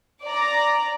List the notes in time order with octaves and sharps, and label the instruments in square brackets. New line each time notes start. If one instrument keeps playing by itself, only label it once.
[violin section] D5 A#5